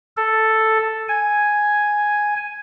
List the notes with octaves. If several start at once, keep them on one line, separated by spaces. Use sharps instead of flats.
A4
G#5